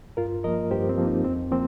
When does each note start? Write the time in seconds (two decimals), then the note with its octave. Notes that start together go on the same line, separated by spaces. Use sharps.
0.17 G2 F4 A#4
0.44 F3 A#3 A#4 D#5
0.71 G2 G4 C5
0.89 C4
0.98 F3 A#3
1.07 D#4
1.24 F2 C4
1.52 F3 A#3 C4